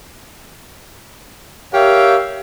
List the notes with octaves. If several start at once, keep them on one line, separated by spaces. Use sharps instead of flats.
G4 A#4 C#5 E5 F5 G5